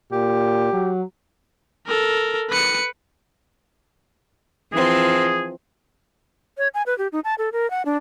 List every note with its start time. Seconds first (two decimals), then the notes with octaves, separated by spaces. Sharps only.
0.12 A#2 G4
0.73 F#3
1.87 A4 A#4
2.50 B4 C#7
4.73 E3 F3 C4 G#4
6.58 C#5
6.74 G#5
6.86 B4
6.98 G4
7.12 D#4
7.24 A5
7.38 A4
7.52 A#4
7.71 F#5
7.86 D4